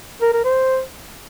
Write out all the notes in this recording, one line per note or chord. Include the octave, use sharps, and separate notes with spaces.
A#4
A#4
C5